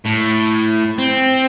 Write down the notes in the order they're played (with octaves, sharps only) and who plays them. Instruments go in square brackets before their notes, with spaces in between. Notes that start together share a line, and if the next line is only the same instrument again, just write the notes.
[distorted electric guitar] A2
C4